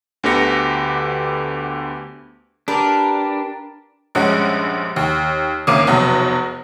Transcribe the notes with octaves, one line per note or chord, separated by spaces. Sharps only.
D2 D3 B3 G4 A#6 C#7
D4 G4 A#4 B4
A#1 G2 G#3 C#4 F#5
D#2
G#1 D2 A#3 C#4 D6 D#7
F1 E2 B2 F#3